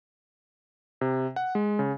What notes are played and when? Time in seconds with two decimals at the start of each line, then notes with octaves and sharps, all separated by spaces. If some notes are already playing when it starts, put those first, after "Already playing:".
1.01 C3
1.36 F#5
1.55 G#3
1.79 C#3